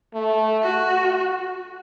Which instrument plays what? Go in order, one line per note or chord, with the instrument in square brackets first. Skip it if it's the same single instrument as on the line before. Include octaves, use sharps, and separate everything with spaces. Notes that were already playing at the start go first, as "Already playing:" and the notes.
[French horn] A3
[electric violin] F#4